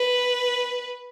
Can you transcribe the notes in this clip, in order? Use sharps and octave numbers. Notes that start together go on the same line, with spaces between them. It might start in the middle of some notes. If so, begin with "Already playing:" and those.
Already playing: B4